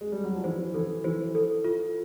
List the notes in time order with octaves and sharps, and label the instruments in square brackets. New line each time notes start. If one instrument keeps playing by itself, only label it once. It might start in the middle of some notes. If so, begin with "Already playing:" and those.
[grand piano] G#3
G3
F#3
F3
[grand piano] E3 [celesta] C5
[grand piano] E3 [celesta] A4
[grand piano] E3 [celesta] C5
[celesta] A4
F4